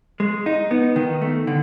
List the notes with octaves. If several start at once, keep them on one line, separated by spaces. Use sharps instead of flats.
G#3
D#4
B3
D#3
A3
D3